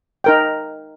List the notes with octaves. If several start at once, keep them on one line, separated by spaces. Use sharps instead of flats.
D#4 A#4 G5